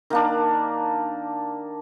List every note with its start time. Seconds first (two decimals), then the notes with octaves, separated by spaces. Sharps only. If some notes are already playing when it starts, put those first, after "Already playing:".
0.10 D#3 A#3 D4